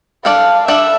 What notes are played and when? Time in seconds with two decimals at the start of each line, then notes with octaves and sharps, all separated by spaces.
0.25 G3 D4 A4 D5 F5
0.68 G3 D4 A4 D5 E5